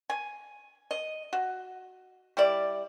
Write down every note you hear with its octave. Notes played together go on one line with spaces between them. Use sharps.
G#5
D#5
F#4
G3 E4 D5